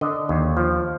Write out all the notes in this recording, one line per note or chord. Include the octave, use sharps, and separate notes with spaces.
D3 D#5
D#2
F3